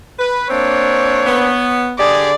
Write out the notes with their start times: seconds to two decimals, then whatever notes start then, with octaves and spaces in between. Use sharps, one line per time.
0.19 B4
0.50 A#3 C4 D4 C#5
1.26 B3
1.98 D3 G4 G#4 D5